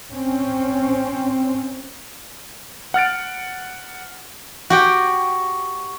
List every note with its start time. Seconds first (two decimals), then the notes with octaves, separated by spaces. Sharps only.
0.13 C4 C#4
2.94 F#5 F6 A6 D7
4.70 F#4 G4 G5